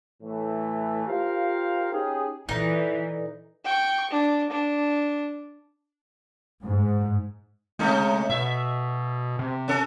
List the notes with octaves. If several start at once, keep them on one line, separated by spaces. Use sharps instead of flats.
A2 E3 A3
F4 G4 A#4 C5 F5
C#4 D#4 G4 G#4
A#2 E3 D#4 F4 A4 B4 D5
G5 C#6
D4
D4
G#2
C3 G#3 A3 D#4
B2 E5
C3
C#4 A4